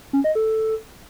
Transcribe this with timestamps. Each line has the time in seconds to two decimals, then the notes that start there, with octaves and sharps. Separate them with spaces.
0.13 C#4
0.24 D#5
0.35 A4